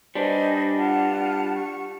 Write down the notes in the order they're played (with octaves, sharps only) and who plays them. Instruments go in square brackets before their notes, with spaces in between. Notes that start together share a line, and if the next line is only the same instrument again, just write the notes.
[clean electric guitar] G3 D4 [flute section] C5 D#5 G#5
[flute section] F4 F#5 A5
C#6